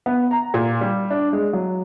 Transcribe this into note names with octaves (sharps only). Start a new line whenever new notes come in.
B3
A#5
A#2
G3
D4
G#3
F#3